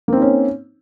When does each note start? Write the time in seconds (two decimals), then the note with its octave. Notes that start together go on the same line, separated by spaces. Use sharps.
0.08 A#3
0.13 C4
0.17 D#4
0.22 C#4